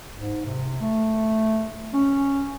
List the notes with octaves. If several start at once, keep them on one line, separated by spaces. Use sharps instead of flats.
G#2
C3
A3
C#4